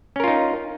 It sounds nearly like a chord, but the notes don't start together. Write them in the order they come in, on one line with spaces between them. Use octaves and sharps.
C#4 A#4 F4 D#4